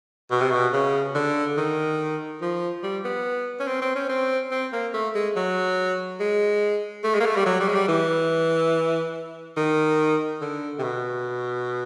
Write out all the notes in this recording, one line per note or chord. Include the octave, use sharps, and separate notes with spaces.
B2
C3
B2
C#3
D3
D#3
F3
G3
B3
C#4
C4
C4
C#4
C4
C4
A#3
A3
G#3
F#3
G#3
A3
G#3
A#3
A3
G3
F#3
G3
G#3
G3
E3
D#3
D3
C3
B2